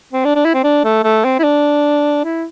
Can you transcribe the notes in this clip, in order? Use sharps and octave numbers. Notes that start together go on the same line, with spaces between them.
C4
D4
D4
E4
C4
D4
A3
A3
C4
E4
D4
E4